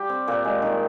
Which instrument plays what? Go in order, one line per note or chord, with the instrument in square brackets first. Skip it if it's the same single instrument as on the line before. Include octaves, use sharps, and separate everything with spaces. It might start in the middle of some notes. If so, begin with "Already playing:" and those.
Already playing: [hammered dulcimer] G3 G4
C4
A#2
G#3
D#3